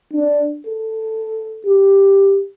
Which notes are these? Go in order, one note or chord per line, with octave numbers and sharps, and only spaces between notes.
D4
A4
G4